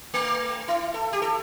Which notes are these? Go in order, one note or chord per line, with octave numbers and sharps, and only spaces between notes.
A3
E4
A4
G4
A4